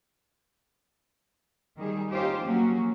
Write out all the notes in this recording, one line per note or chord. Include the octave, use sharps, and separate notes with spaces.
D#3 G3 G#4
C#4 D#4 F4 G4 C5
F3 F#3 A#3 C#4 F#4